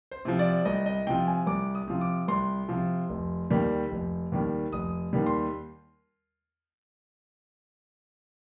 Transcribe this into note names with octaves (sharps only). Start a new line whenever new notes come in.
C5
C3 F3
D5
C2 D#5
D#5
C3 F3 G5
G#5
C2 D6
D#6
C3 F3
D6
C2 C6
C3 F3
F1
D#2 D#3 G3
F1
D#2 D#3 G3
F1 D#6
D#2 D#3 G3
C6